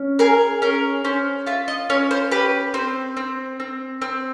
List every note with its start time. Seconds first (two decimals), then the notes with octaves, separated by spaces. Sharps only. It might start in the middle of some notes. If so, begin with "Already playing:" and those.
Already playing: C#4
0.19 G#4 A#4
0.62 C#4 A#4
1.04 C#4 C5
1.46 F4 E5
1.68 D#5
1.90 C#4 C#5
2.11 C5
2.31 G4 B4
2.74 C4 C5
3.17 C4
3.60 C4
4.02 C4